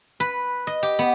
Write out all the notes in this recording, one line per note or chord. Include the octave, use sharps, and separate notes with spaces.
B4
D#5
G4
B3